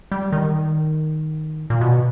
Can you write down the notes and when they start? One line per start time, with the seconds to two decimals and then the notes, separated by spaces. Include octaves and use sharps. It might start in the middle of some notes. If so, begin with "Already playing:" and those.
0.11 G3
0.32 D#3
1.70 A#2
1.81 B2